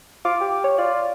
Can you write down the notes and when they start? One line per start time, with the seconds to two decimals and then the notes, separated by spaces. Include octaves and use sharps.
0.25 F4 D6
0.41 G4
0.64 C#5
0.78 F4 D5